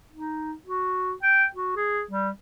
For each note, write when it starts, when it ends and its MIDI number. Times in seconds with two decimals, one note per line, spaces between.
0.13 0.53 63
0.67 1.13 66
1.23 1.44 79
1.55 1.72 66
1.76 2.01 68
2.11 2.29 55